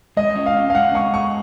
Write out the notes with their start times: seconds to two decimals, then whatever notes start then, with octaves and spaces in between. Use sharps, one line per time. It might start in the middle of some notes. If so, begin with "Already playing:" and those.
0.17 G#3 D#5
0.36 C#4
0.46 F5
0.56 C#4
0.70 F5
0.75 G#3 F#5
0.94 G#3 C#6
1.14 G#4 C#6